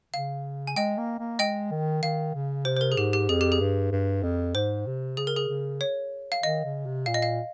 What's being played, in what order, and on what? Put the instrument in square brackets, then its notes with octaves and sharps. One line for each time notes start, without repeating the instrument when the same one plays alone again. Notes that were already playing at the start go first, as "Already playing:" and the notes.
[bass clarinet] C#3 [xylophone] F5
[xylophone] G#5
[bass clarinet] G#3 [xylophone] D#5 G5
[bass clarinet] A#3
A#3
[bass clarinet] G#3 [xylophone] D#5 G5
[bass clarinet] D#3
[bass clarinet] D#3 [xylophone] F5
[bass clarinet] C#3
[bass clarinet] C3 [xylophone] C5
[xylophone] C5
A#4
G#4
[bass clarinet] G#2 [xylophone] G4
[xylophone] G4
[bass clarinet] F2 [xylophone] G#4
[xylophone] G4
G#4
[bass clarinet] G2
G2
F2
[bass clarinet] G#2 [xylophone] C5
[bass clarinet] C3
[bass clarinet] C#3 [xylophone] G#4
[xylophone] A#4
G#4
[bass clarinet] C#3
[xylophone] C#5
F5
[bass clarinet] D#3 [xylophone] D#5
[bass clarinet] C#3
C3
[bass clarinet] A#2 [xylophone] F5
[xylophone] D#5
F5